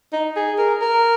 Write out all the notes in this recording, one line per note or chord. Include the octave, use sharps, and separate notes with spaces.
D#4
G#4
A#4
A#4